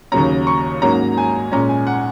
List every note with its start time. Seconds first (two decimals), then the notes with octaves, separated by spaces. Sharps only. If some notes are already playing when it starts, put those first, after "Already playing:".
0.12 D#2 C#3 F#3 A#3 C#4 A#5
0.47 C#6
0.81 G#2 F#3 A#3 C#4 A#5
1.18 G#5
1.52 A#2 G#3 C#4 A#5
1.69 G#5
1.87 F#5